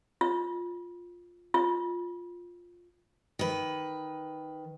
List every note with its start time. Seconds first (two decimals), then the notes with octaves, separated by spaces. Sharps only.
0.21 F4
1.54 F4
3.39 D#3 B4